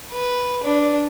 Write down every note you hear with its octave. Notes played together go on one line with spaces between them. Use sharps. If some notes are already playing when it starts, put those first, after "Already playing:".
B4
D4